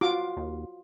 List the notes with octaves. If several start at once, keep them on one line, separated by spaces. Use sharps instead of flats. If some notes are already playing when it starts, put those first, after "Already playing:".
F4 F#4 D6
D#2